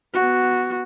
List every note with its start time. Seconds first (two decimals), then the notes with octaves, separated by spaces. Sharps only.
0.14 B3 F#4